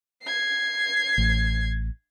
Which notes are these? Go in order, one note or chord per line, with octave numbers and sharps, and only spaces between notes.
G#6 C7
A1